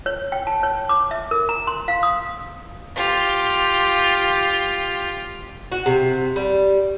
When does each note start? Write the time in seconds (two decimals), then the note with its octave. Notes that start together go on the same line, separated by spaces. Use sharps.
0.06 C#5
0.32 G5
0.47 A5
0.63 C#5
0.89 D6
1.11 E5
1.31 A#4
1.49 A#5
1.67 C6
1.88 F5
2.03 D#6
2.96 F4 G4
5.72 F#4
5.86 C3
6.36 G3